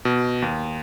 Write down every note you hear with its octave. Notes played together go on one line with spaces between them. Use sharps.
B2
D#2